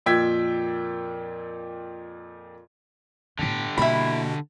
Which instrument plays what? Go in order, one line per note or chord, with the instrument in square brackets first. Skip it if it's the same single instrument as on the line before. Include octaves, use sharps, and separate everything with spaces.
[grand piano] F2 A#2 G5 E6 G#6 B6
[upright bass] A2 B3 [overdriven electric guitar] D3 G4
[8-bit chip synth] B2 [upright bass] A#3 [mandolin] E4 B5